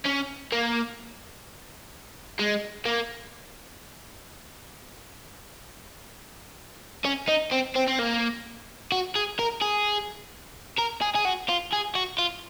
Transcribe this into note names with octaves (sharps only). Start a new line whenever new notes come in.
C#4
A#3
G#3
A#3
C#4
D#4
C4
C4
C4
A#3
F#4
G#4
A#4
G#4
A#4
G#4
G#4
F#4
F4
G#4
F#4
F4